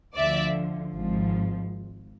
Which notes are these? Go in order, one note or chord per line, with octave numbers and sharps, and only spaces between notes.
D2 D3 F3 D5 E5
G#1 G#2 F3